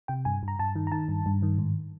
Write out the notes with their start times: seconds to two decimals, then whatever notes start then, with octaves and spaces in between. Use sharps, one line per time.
0.08 C3 G5
0.25 G2 G#5
0.43 G2
0.48 A#5
0.59 G2 A5
0.76 D#3
0.87 A#5
0.92 D#3 A5
1.09 G2
1.26 G2
1.43 D#3
1.58 G#2